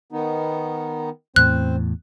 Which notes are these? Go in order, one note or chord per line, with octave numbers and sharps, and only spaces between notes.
D#3 B3 D#4
E2 A2 C4 C5 F#6